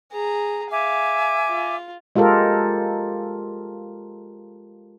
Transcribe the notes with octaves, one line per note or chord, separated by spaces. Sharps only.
G#4 A#5
E5 F5 G#5 D6
F4
G#3 F4 G4 A4 A#4